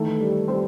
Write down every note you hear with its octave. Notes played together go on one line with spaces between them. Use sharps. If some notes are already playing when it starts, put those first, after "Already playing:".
Already playing: D#3 E3 A3 A4
G3
G3 C4 C5